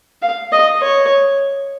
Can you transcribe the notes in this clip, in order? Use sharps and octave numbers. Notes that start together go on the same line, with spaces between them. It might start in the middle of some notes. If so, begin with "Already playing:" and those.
F5
D#5
C#5